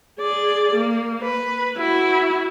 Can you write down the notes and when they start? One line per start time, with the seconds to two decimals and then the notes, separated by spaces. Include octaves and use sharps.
0.20 G#4 D5
0.75 A#3
1.22 B4
1.78 E4 F#4